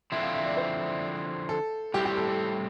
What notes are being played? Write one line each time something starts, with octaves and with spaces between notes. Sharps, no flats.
D3 F3 C4 E4 E5
F5
E5
D5
C5
A4
A2 G3 C4 E4 G4
G4
A4
A4